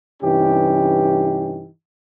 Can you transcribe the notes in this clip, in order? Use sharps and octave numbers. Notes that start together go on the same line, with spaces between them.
G2 C3 E3 C#4 D#4 G4